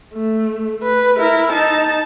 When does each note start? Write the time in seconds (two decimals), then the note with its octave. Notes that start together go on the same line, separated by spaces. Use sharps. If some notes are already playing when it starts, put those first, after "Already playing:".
0.13 A3
0.83 B4
1.17 E4 A#4
1.52 D#4 A5